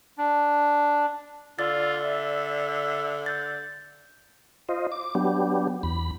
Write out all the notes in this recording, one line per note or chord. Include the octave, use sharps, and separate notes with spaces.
D4
D3 F4 D5 E6 A6
E5
G6 A6
F4 C5 D#5
D6
F#3 B3 D4 G4
E2 B5